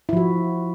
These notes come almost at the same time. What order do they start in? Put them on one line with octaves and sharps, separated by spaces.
E4 F3 F#4